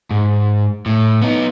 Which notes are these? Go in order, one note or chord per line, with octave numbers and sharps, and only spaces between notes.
G#2
A2
B3 D#4